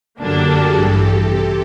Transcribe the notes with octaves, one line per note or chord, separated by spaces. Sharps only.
F#2 D3 F#3 A#3 D4 G4 A4
F#4 G#4
A1 G2 E3 G4 A4
G4 A4
C3